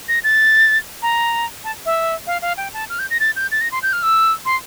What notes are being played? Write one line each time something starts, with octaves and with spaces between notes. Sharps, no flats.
A#6
A6
A#5
A5
E5
F5
F5
G5
A5
F6
G6
A#6
A6
G6
A6
A#6
C6
G6
F6
E6
C6